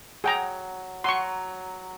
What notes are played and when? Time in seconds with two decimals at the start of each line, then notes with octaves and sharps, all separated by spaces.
0.24 F#3 G#4 G5 A#5
1.04 F#3 C6 C#6